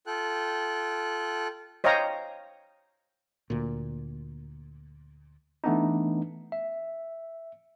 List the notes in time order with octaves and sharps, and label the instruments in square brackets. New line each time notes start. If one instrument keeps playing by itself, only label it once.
[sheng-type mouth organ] F4 A4 G5 F#6
[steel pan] C5 C#5 D#5 F5 G5 A#5
[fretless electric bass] D2 A#2
[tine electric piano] E3 A3 B3 D4 D#4
E5